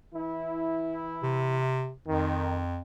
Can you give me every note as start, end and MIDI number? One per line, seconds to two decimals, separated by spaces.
0.13 1.75 52
0.13 1.75 64
1.23 1.92 48
2.07 2.81 41
2.07 2.63 51